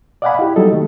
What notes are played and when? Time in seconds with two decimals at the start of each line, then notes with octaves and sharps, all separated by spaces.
0.22 D5 D#5 F5 F#5 G#5 B5
0.39 E4 G4
0.56 F#3 G3 D#4 A4 D#5
0.73 D#3 A3